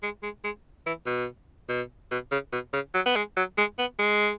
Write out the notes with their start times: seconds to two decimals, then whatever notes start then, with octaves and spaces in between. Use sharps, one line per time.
0.03 G#3
0.23 G#3
0.44 G#3
0.86 E3
1.06 B2
1.69 B2
2.12 B2
2.32 C#3
2.53 B2
2.73 C#3
2.94 F#3
3.06 B3
3.16 G#3
3.37 F#3
3.58 G#3
3.79 B3
3.99 G#3